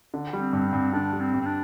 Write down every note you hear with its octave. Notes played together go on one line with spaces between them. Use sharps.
D3
G3
C4
G2
C4
G2
D3 D4
G3
C4
G2
C4
D4